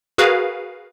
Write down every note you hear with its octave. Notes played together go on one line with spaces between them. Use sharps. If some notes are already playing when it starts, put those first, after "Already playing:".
F#4 G#4 A#4 B4 F5